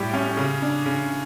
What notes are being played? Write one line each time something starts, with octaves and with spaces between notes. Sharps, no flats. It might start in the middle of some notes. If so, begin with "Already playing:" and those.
Already playing: A2 G3 G4
C#4
C#3
D4
C#3